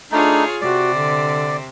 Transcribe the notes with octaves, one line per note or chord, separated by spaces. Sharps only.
A3 D4 D#4 F4 G#4 C#5
C3 F#4 D5
D3